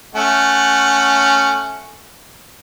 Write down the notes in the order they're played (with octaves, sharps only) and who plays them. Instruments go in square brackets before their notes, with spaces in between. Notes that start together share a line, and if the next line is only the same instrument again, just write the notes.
[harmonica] A3 C#4 F#5